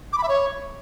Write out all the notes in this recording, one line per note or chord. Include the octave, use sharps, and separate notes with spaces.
D6
B5
E5
C#5